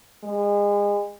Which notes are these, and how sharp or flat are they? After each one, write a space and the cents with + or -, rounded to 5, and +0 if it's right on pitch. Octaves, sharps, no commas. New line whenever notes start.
G#3 -30